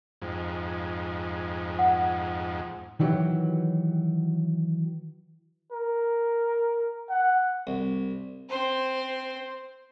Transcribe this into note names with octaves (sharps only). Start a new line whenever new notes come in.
F2 G#2
F#5
D#3 E3 F#3 G4
A#4
F#5
C2
C4 C5